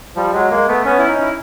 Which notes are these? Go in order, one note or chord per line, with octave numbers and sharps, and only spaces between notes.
F3 G3
F#3 G#3
G#3 A#3
A3 B3
B3 C#4
E4
C#4 D#4
E4